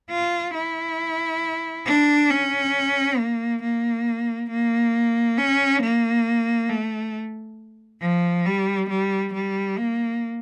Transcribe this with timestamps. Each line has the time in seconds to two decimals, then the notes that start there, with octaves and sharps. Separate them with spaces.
0.10 F4
0.54 E4
1.86 D4
2.30 C#4
3.18 A#3
3.63 A#3
4.50 A#3
5.38 C#4
5.82 A#3
6.70 A3
8.01 F3
8.46 G3
8.90 G3
9.34 G3
9.78 A#3